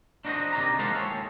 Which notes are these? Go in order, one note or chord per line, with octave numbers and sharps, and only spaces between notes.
D4 D#4 F#4 A#4 C5 D#5
C3 D#3 D5 D#5 A#5
G#3 A#4 C5 F5 F#5 A5
D#2 G#4 A4 C#5